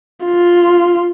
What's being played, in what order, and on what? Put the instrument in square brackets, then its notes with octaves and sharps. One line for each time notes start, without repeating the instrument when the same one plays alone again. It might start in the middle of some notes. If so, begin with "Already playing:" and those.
[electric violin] F4